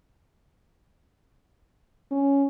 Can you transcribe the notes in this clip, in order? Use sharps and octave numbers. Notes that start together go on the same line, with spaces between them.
C#4